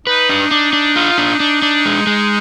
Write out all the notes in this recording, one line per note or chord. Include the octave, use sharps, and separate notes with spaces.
D#4 B4
D4
D4
D4
F4
D4
D4
D4
G#3
G#3